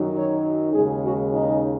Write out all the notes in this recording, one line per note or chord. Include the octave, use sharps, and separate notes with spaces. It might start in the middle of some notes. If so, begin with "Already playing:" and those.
Already playing: F#2 D#3 F#3 D#4
C#5
D#2 C#3 G#3 G#4
F#4
D#4